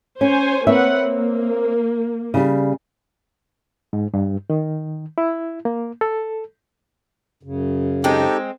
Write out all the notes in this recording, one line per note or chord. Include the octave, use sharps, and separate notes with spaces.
C#4 C5 C#5 G#5
A#3 C4 B4 C#5 E5 F#5
A#3
C#3 G3
G#2
G2
D#3
E4
A#3
A4
F#2 C#3
G#3 C4 D#4 G4 A4